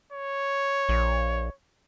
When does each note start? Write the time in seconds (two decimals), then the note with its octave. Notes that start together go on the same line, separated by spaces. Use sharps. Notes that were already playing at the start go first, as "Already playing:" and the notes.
0.13 C#5
0.89 A#1